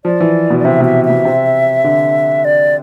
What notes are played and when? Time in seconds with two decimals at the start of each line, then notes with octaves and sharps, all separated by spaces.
0.05 F3 D5
0.20 E3
0.50 B2
0.59 D5
0.65 C3 E5
0.80 B2 E5
1.05 E5
1.10 B2
1.25 C3
1.84 D3
2.45 D5